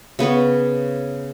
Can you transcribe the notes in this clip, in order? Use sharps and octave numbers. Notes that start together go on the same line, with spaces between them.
C#3 B3 B4 C#5